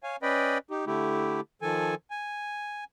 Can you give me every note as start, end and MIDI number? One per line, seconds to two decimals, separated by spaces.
0.03 0.16 73
0.03 0.16 77
0.03 0.16 80
0.22 0.58 61
0.22 0.58 71
0.22 0.58 74
0.22 0.58 75
0.22 0.58 79
0.22 0.58 83
0.71 0.85 63
0.71 0.85 67
0.87 1.41 50
0.87 1.41 57
0.87 1.41 64
0.87 1.41 67
1.62 1.95 51
1.62 1.95 53
1.62 1.95 69
1.62 1.95 80
2.11 2.84 80